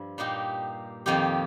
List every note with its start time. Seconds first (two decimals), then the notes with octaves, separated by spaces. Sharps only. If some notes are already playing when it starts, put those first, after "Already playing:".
Already playing: G2 F3
0.18 A#2 A#3 D#4 G4
1.06 F2 D#3 A#3 D#4 G4